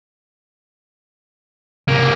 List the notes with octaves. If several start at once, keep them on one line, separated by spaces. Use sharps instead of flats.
C2 C3 A#3